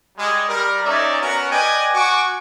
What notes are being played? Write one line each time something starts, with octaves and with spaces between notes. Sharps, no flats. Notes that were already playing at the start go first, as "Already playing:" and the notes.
G3 G#3
G3 A#4
C#4 D#4 A#4 D5 E5 G#5
B3 C#4 F#4 A#4
B4 D5 D#5 G5 G#5
F#4 G#5 C#6 D6